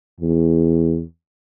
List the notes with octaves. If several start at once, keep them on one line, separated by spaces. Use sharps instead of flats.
E2